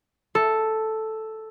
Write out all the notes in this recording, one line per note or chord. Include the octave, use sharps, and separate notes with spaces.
A4